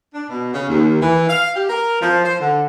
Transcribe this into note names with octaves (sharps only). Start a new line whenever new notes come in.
D4
B2
C#3
D#2
E3
F5
G4
A#4
F3
C5
D3